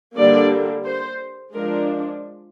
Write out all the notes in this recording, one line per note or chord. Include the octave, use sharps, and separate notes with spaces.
D3 G3 A#3 D4 D5
C5
F3 G#3 D4 A#4